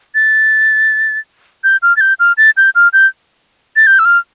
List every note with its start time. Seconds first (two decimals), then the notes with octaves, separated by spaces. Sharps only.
0.15 A6
1.64 G6
1.82 F6
1.97 A6
2.01 G6
2.20 F6
2.37 A6
2.57 G6
2.75 F6
2.93 G6
3.76 A6
3.87 G6
3.99 E6
4.05 F6